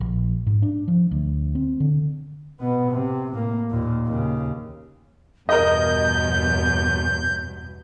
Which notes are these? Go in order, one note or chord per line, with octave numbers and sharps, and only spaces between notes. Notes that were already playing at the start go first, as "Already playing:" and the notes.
A#1
G#2
D4
F3
D2
C4
D3
B2 B3
C3
A2 A#3
D#2 A#2
D#2 C#3
E2 G2 B2 A#4 D#5 G6